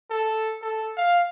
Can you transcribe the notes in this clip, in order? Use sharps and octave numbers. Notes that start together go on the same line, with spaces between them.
A4
A4
F5